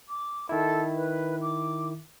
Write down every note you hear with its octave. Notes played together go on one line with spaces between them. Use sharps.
D6
D#3 E4 A4
B4
D6